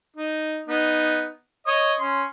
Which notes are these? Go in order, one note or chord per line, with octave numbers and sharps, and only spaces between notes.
D#4
B3 D#4
C#5 D#5 D#6
C#4 C6